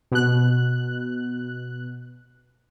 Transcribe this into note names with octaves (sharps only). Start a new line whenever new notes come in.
B2 F#6